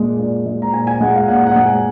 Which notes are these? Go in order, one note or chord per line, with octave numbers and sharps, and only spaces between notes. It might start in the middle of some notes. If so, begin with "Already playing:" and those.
Already playing: A#2 G#3
A#2
G#3
A#5
A#2 G#5
G#5
G#3 F#5
F5
A#2 F#5
F#5
G#3
G#5